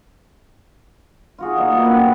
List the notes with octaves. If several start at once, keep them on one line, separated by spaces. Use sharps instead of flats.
F4 F#4 G#4
A#2 A3 D#4 D#5
A#3 B3 E4 F#4
A2 C4 D4 F#5
G2 A4 B4 F#5